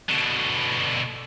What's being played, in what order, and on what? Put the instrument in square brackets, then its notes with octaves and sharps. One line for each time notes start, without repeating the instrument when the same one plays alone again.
[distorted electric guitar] B2 D3